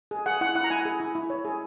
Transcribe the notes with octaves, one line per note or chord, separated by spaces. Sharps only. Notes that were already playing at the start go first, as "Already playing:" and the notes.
G#4
G#4 F#5
E4 F#5
E4 F#5
A#5
E4 G#5
G#4
E4
E4
C#5
G#4